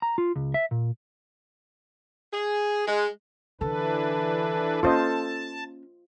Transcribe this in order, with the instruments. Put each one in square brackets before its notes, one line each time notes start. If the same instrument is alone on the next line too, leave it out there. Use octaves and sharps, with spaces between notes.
[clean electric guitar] A#5
F4
C#2
E5
A#2
[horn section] G#4
G#3
[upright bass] D3 [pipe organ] E3 D4 B4 [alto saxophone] A4
[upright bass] A#3 C#4 [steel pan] F4 C5 D#5 [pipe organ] A5